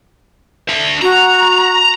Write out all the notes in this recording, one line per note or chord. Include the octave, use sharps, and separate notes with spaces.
D4 E5
F#4 A#5